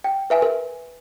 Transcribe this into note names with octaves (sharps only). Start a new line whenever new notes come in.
G5
B4 E5 G#5
A#4